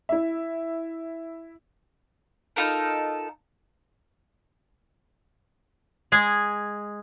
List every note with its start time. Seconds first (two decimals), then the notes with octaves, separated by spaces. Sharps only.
0.09 E4 E5
2.56 D#4 F4 A4 A#4
6.12 G#3 G#4